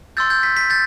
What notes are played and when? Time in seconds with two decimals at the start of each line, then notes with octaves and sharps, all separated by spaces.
0.17 C6 E6 G6 A6
0.30 G6
0.43 B6
0.57 B6
0.70 G6 A6